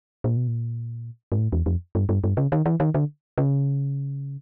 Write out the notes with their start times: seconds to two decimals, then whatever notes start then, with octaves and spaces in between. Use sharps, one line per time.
0.24 A#2
0.37 B2
0.48 A#2
1.32 G#2
1.38 A2
1.52 E2
1.66 F2
1.95 G2
2.09 G2
2.24 G2
2.37 C#3
2.52 D#3
2.66 E3
2.80 D#3
2.94 D3
3.38 C#3